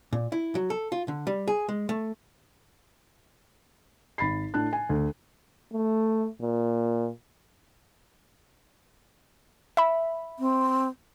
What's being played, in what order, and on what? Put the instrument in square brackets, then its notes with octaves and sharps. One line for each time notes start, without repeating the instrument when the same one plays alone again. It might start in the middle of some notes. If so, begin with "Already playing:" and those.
[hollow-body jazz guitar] A#2
E4
F#3
A4
F4
D3
G3
G#4
G#3
A3
[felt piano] G#1 B5 A6 C7
A2 D4 A5 F#6
G#5
D2
[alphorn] A3
A#2
[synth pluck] E5 B5
[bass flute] C4